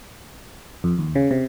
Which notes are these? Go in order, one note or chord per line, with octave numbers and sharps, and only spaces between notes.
F2
D#2
C#3
C3